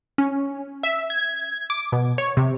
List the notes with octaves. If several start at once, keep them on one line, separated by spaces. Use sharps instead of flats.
C#4
E5
G#6
D6
B2
C#5
C3